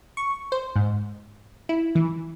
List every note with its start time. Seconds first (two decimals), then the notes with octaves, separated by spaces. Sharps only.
0.17 C#6
0.52 C5
0.76 G#2
1.69 E4
1.95 E3